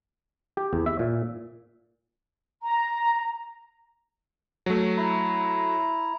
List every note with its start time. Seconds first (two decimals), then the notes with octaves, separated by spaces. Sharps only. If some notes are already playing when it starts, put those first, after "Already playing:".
0.57 G4
0.73 E2
0.86 E5
0.99 A#2
2.63 A#5
4.66 F#3 A3
4.97 E4 A#5